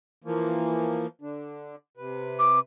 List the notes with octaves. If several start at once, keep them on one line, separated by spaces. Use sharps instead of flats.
E3 F3 A#3
D3 D4
C3 B4
D6